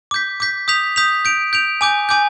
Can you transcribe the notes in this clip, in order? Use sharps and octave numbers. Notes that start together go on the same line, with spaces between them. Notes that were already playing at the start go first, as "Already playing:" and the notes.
D6 G6 B6
D6 G6 B6
D#6 G6 B6 F7
D#6 G6 B6 F7
G6 D7 F7
G6 D7 F7
G#5 D6 G6
G#5 D6 G6